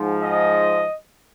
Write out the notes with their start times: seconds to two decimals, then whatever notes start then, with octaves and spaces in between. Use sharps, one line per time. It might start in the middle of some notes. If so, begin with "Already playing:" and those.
Already playing: G#2 F3
0.23 D#5